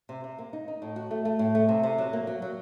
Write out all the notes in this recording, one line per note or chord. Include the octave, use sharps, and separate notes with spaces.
C3
C3
A#3
D#4
D#4
A2
F#4
A3
A3
A2
A3
C3
C3
F#3
A#3
F#3
F#3